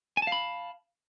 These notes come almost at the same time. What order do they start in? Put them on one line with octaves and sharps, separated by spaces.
G#5 A5 F5 B5